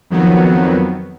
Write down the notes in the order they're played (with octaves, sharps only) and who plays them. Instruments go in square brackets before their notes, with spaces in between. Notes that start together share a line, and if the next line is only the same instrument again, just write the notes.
[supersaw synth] F2 D#3 F#3 B3